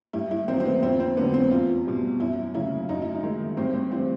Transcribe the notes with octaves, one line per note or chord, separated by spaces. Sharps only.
G2 E4
E4
D#3 F#3 C4
C4
B3
F2 C4
C4
D3 F#3 B3
C4
E2 F4
B2 G3
F#2 E4
C#3 F#3 E4
F#2 D#4
E4
D#4
D#3 G#3
G2 C4
C4
E3 G3 C4